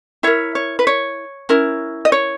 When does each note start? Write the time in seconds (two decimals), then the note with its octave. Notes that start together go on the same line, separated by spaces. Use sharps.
0.23 E4 A#4 C#5 E5
0.55 C#5
0.79 B4
0.87 C#5
1.49 C#4 E4 A#4
2.05 D#5
2.12 C#5